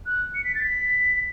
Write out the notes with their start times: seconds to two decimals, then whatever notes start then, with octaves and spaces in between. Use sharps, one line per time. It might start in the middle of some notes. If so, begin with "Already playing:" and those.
0.06 F#6
0.35 C#7
0.44 B6
0.55 A6
0.63 B6